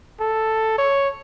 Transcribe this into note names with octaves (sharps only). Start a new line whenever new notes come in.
A4
C#5